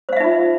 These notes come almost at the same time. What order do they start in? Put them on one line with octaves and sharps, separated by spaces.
C5 F5 E5 D#4 F4